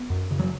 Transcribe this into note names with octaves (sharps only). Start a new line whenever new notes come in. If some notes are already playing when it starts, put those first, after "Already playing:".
Already playing: B3
F#2
C#3
F#3